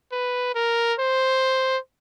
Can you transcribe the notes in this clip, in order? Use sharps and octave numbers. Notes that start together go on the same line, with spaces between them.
B4
A#4
C5